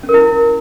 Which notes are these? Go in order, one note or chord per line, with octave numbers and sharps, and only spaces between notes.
C#4
A#4
E4